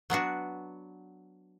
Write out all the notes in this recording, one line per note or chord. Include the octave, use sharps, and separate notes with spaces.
F#3 B3 D4 F#4